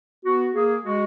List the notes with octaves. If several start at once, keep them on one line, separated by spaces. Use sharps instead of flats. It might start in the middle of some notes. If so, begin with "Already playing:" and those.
B3 F#4
A#3 G#4
G#3 F#4